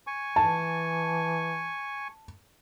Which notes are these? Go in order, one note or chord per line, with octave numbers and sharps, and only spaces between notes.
G#5 C#6
E3 A5